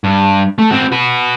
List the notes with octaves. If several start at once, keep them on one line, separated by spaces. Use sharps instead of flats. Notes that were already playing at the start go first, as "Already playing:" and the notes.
G2
A3
C4 F#4
F#4 B4